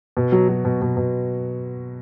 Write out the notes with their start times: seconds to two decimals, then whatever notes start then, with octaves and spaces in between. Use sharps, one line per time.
0.17 B2
0.32 F#3
0.48 F#3
0.65 B2
0.82 B2
0.97 B2